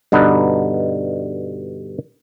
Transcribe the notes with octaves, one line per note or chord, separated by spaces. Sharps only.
G2 B2 D3 D#4 B4